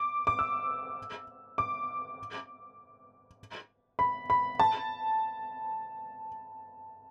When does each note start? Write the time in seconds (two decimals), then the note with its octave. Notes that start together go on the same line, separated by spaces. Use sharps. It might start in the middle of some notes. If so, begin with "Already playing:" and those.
Already playing: D6
0.27 D6
0.39 E6
1.58 D6
3.99 B5
4.30 B5
4.60 A5